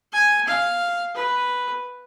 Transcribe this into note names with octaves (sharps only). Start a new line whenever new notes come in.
G#5
F5
B4